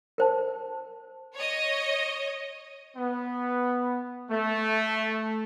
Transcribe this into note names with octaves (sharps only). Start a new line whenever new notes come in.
A#4 C5 A5
C#5 D#5
B3
A3